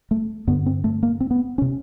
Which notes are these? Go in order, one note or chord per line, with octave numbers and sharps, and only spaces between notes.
A3
G2 D3 B3
C4
A3
A#3
C4
B3
C#4
C3